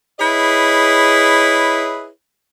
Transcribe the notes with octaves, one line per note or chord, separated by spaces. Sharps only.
E4 G#4 B4 C#5 D#5